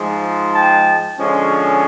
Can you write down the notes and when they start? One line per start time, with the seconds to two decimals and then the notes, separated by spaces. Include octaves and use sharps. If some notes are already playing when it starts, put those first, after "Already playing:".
Already playing: G#2 F3 G#3
0.54 G5 A5
1.18 D3 F3 G#3 C#4